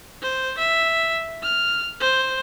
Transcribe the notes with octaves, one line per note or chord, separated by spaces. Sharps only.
C5
E5
F6
C5